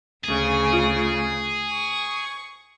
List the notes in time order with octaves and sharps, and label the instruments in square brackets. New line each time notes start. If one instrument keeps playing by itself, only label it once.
[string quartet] D2 C#3 [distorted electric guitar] G#4
[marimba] F4
[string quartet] C#6